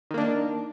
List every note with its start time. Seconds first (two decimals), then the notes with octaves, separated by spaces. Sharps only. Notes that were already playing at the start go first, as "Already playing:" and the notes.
0.11 D#3
0.14 A#3
0.18 D4